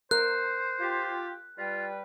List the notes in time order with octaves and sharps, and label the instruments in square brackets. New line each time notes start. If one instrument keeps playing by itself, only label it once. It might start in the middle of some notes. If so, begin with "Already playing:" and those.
[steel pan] A#4 [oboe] C5 [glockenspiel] F#6
[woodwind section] F4 G4
[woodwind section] G3 B4 G5 [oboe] F4